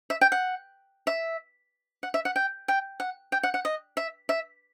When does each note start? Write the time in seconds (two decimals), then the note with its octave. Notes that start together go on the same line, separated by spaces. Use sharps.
0.10 E5
0.21 G5
0.32 F#5
1.07 E5
2.03 F#5
2.14 E5
2.25 F#5
2.36 G5
2.68 G5
3.00 F#5
3.32 G5
3.43 F#5
3.54 F#5
3.65 D#5
3.97 E5
4.29 E5